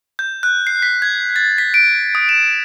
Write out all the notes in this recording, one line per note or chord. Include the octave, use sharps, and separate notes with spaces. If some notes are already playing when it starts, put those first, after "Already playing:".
G6
F#6
C7
B6
G#6
A6
B6
D7
D#6
E7